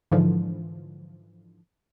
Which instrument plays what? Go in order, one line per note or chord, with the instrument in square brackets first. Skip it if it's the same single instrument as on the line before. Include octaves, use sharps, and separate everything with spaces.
[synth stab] G#2 D3 E3 F3